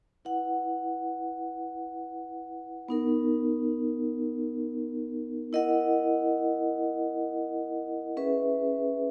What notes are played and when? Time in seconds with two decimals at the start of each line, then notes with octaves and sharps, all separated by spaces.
0.25 E4 B4 F#5
2.89 B3 D#4 A#4
5.53 E4 A#4 D#5 F#5
8.17 C#4 G#4 B4 E5